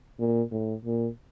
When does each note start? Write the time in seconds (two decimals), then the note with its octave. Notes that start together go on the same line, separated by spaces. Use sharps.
0.19 A#2
0.51 A2
0.85 A#2